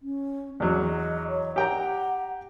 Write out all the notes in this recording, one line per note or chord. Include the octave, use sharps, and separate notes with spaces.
C#4
E2 F#3 D#5
C#5
G4 F#5 G5 A#5